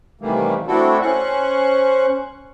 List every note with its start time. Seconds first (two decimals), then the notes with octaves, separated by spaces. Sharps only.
0.21 C3 D#3 E3 G3 A3 A#3
0.67 A3 C4 D4 E4 F#4 A4
1.02 C#4 C5 C#6 F#6